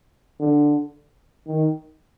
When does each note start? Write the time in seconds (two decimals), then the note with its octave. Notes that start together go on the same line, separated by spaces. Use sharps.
0.40 D3
1.47 D#3